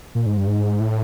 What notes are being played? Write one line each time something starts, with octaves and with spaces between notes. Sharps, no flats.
A#2
G#2
G2
G#2
A2